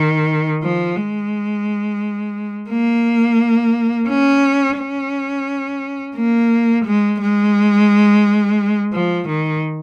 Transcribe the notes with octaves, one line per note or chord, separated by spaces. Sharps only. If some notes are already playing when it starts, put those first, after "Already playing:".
Already playing: D#3
F3
G#3
A#3
C#4
C#4
A#3
G#3
G#3
F3
D#3